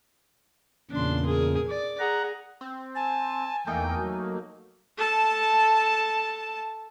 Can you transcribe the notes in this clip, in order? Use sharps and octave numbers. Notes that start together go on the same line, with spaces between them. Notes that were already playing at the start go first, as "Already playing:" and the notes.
E2 A#2 C#3 D4 C6
G#4 A#4
D5
G#4 F#5 A#5
C4
G#5 A5
E2 A3 A#3 D#4 G5
F#3
A4 A5